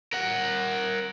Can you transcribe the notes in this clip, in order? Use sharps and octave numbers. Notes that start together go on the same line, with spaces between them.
A#4 F#5